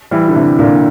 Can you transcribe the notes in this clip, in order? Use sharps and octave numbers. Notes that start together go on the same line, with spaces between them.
E3 G3
D3
C3 E3
A#2 D3